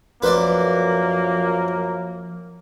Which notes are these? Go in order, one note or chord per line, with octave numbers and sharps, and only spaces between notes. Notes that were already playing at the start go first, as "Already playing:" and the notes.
F#2 F3 A#3 B4 C5 D5